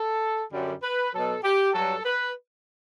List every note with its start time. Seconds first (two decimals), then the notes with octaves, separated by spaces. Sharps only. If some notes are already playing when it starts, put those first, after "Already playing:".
Already playing: A4
0.52 F#2 D3 G3
0.83 B4
1.13 B2 F#3 A4
1.43 G4
1.73 G2 F#3 A4
2.04 B4